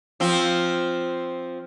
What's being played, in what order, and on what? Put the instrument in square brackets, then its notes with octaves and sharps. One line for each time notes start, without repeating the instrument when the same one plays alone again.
[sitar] F3 C4